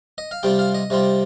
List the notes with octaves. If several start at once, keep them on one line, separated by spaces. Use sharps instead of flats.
D#5
F5
C3 G3 C4 F4 G5
F5
D#5
C3 G3 C4 F4